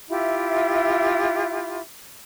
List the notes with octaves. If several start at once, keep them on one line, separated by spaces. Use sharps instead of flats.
E4 F4 G4 E5